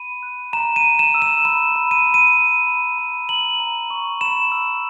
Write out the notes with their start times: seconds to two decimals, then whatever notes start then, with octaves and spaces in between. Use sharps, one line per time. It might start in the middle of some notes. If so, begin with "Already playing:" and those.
Already playing: B5 D#7
0.23 F#6
0.53 A#5 E7
0.76 D#7
0.84 A#5
0.99 E7
1.14 E6
1.22 E7
1.45 B5 E7
1.76 B5
1.91 D#7
2.06 B5
2.14 D#7
2.37 B5
2.67 B5
2.98 B5
3.29 A#5 F#7
3.60 A#5
3.90 C#6
4.21 B5 E7
4.52 E6